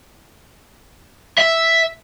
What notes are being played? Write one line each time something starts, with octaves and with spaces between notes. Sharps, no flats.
E5